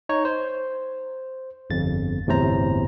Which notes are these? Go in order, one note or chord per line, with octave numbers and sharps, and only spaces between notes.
D#4 C#5
C5
G1 F2 A6
G1 E2 A2 C3 C5 A#5